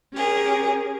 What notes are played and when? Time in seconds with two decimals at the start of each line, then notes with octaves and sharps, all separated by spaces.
0.13 C#4 G4 G#4 A#4